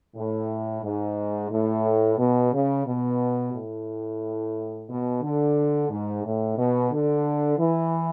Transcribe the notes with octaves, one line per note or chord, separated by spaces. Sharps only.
A2
G#2
A2
B2
C#3
B2
A2
B2
D3
G#2
A2
B2
D3
E3